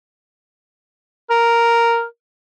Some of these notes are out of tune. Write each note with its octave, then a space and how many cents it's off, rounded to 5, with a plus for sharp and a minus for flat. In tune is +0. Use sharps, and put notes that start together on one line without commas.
A#4 +0